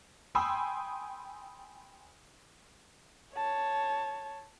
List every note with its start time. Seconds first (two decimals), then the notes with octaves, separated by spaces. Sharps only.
0.35 G5 G#5 B5 C6 D#6 E6
3.34 C#5 A5